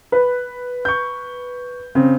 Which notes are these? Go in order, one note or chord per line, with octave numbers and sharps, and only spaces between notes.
B4
C#6 G6
C#3 C4